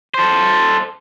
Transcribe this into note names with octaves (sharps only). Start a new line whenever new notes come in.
A4 C5